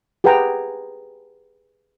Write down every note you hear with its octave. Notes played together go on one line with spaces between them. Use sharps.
G4 G#4 B4 F#5 G5 A#5